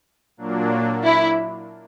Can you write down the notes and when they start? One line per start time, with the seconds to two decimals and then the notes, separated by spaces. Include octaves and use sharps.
0.37 A#2 F#3 A#3 D4
1.04 E4